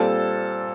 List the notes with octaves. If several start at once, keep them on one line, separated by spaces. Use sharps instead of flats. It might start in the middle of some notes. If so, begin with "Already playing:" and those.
Already playing: A#2 G3 C4 A4 A5